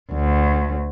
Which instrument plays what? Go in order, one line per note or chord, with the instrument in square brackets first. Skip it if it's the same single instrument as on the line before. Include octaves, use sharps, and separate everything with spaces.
[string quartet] D2